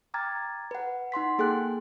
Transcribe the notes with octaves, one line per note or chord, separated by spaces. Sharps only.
G5 A#5 D6 F6 G#6 A6
B4 F#5
D#4 F#5 C6 B6
A#3 G#4 A4 G5 F#6